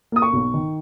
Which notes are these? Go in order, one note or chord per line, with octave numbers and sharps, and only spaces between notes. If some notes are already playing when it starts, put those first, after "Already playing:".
A#3 D#6
C#6
B1
D#3